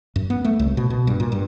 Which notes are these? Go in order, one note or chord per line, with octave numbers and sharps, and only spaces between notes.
F#2
B3
A3
C2
B2
B2
G2
A#2
G2